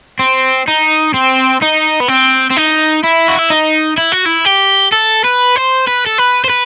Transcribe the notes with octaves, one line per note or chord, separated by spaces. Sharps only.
C4
D#4
C4
D#4
B3
C4
C4
D#4
E4
F#4
E4
D#4
E4
F#4
E4
G4
A4
B4
C5
B4
A4
B4
C5
B4